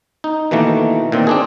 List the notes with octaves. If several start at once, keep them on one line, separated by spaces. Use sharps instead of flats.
D#4
B2 D#3 E3 A3 A#3
A#2 D#3 C4
C4 D4 G#4